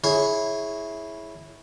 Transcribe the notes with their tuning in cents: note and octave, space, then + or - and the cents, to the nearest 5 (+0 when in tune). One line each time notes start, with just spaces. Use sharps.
E4 -10 G#4 +10 C#5 +0